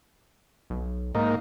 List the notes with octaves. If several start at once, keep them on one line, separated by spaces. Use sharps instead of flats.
B1
G#2 A#3 D#4